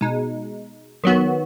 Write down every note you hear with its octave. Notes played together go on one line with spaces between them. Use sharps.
B2 G#3 D#4
D#3 F#3 B3 F#4